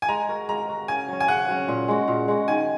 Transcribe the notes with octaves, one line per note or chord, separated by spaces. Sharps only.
G#5
G#3 A#5
F#4 A#4
G#3 A#5
F#4 A#4
C#3 G#5
F#3 C#4
G#5
C#3 F#5
F#3 C#4
A#2
G#3 F#4
A#2
G#3 F#4
D#3 G#5